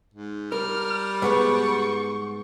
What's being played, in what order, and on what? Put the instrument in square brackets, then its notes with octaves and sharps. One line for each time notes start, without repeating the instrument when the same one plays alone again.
[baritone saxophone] G#2
[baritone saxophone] G3 [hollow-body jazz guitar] A#4 [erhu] F6
[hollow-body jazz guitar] G#2 B3 B4 [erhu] C#6